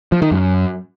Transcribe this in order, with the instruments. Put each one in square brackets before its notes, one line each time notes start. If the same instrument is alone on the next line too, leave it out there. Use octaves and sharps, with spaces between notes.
[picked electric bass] F3
D#3
F#2